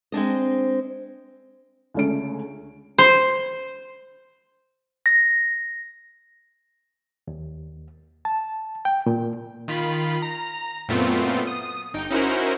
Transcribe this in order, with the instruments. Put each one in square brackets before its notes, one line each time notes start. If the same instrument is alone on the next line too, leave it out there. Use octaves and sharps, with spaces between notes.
[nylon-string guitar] G#3 C4 D4 D#5
[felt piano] C#2 D3 A3 C#4 A4 D7
[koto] C5
[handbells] A#6
[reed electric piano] D#2
A5
G5
A#2
[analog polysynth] D#3 F4 B5
A#5
F#2 A#2 A3 B3 C4 F4
D#6
G1 D#4 G5
C#4 D#4 E4 F#4 A#4 C5